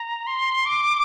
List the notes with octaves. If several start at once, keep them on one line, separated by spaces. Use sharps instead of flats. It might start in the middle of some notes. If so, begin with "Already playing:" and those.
Already playing: A#5
C6
D6